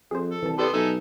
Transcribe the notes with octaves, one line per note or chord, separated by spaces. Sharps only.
F2 G#4 C5
A4
C2 E3 A5
B3 G4 A4 C5 D5
B1 D#4 A4 E5 G#5